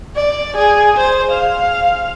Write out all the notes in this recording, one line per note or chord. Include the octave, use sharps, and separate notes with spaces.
D5
G#4
C5
F5